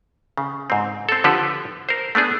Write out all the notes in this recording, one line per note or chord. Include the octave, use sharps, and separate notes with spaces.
C#3
G#2 C4
C4 A4
D3 F3 G4 A4 B4
A#4 C5
A3 B3 D4 G#4